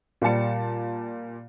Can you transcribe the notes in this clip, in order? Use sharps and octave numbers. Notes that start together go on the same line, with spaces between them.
A#2 G3 A5 C#7